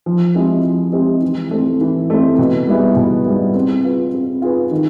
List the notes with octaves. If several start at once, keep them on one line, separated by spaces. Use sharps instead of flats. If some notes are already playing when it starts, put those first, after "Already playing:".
F3
G#3 C4 E4 G4
F3
G#3 C4 E4 G4
E3
A3 C4
E3
A3 C4
B2
G3 B3 E4 G#4
B2
G3 B3 E4 G#4
C4
F4 G#4 B4
C4
F4 G#4 B4
D#3